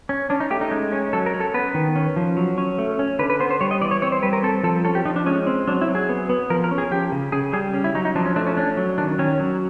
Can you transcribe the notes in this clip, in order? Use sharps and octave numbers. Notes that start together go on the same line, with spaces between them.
C#4
C#4 D4
D#4
A3 G4
D#4
G#3
C#4
F#3 A4
A#4
C#4
A4
B3 B4
D#3
C#4
F3
F#3
C#4
A3
C#4
D3 B4
B4
B3 C5
C5
G3 C#5
D#5
E3 D5
C#5
C4 C#5
C5
G3 B4
A#4
C4 A4
F3 A4
C#4 A4
G4
F3 D#4
D4
G#3 C#4
C4
F#3 D4
E4
F#3
G#4
B3
B3
F3 A#4
A#4
C#4
G#4
F3 G4
C#3
C#3 G#4
G3 G#4
C#4
E4
F#3 D#4
D#4
F3 D4
C#4
A3 D4
C#4
C#4 D4
F#3
D#3 D4
D#3 C#4
F#3